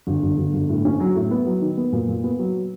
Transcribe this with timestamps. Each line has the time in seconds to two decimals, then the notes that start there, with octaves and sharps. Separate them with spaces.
0.07 G1
0.22 G1
0.38 G1
0.54 G1
0.69 A2
0.85 C#4
1.00 F#3
1.16 A2
1.31 B3
1.46 F#3
1.61 D#3
1.77 B3
1.92 A#2
2.08 A#2
2.24 B3
2.39 F#3